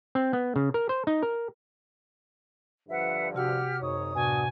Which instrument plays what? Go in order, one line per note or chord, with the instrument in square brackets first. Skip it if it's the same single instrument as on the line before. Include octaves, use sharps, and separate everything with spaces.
[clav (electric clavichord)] C4
B3
C#3
A#4
C5
D#4
A#4
[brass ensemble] G2 D3 F3 [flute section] B4 E5 F#5
[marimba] C3 F#4 E6 [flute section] G4 F#5 F6
[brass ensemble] G#1 D#4 C#5 [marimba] F#2 [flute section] D#6
[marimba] A2 C3 [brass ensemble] B3 D4 F#4 [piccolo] G#5